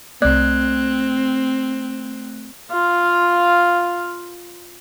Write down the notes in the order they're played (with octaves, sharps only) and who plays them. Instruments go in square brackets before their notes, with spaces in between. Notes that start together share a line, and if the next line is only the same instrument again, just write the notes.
[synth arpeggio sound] C2 D5 [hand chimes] A3 F#6 G#6 [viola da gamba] C4
[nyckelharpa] F4 F5